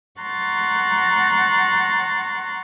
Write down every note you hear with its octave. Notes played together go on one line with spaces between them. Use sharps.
F#5 A#5 C6 C#6 F#6 A6